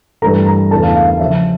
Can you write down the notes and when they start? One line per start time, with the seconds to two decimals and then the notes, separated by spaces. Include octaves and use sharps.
0.22 G2 E3 A3 A#5
0.46 A#5
0.71 E2 C#3 E3 A3 D4 A5
0.83 F5
0.96 F5
1.07 F5
1.20 C#3 F3 C#4 E5